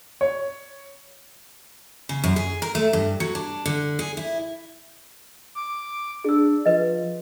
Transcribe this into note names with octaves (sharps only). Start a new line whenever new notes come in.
C#5
C#3
F#2
G#4
A#4
A3
G2
F#3
D4
D3
G#4
E4
D6
D4 G#4 E6
F3 B4 D#5